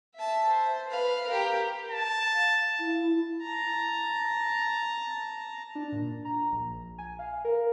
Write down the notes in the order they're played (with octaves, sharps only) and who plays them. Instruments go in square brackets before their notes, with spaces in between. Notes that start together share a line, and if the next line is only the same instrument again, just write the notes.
[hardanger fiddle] E5 A5
C5
B4 F5
G4 A#4
[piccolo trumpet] A5
[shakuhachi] F5
E4
[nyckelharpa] A5 A#5
[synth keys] D4
A#2
A#5
A#1
G#5
F5
A#4